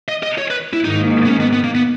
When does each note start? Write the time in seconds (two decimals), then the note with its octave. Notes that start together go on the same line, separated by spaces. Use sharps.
0.08 D#5
0.23 D#5
0.38 C#5
0.50 B4
0.73 E4
0.84 G#2 D#3 A#3 D#4
1.26 B3
1.29 C#4
1.40 B3
1.53 B3
1.64 A#3
1.75 B3